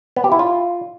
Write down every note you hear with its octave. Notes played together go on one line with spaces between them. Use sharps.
B3
G4
E4
F4